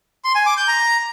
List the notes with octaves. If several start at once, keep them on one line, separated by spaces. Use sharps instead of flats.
C6
G#5
D6
G6
A#5